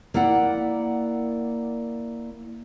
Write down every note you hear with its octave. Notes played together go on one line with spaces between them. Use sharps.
A#3 E4 D5 F#5